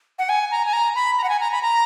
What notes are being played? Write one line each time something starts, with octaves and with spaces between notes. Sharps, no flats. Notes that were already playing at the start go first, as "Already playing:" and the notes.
F#5
G#5
A#5
G#5
A#5
B5
A#5
F#5
G#5
A#5
B5
A#5